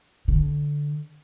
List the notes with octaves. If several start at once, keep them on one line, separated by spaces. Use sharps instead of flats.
D3